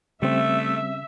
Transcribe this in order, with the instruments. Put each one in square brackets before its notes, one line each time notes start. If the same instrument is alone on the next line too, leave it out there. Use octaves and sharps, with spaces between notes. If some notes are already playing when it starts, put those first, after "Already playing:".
[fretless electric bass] C#3 [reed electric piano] G3 C4 [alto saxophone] A3 [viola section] E5